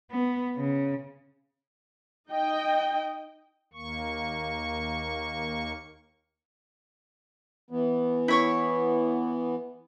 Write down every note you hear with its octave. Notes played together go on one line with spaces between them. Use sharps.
B3
C#3
D#4 D#5 G5
D#2 A#3 C#6
E3 B3
E4 C#5 C#6